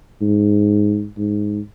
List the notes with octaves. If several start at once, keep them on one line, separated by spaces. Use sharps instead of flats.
G#2
G#2